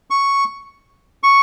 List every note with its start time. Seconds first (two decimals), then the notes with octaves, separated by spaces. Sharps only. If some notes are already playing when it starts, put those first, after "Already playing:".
0.10 C#6
1.23 C#6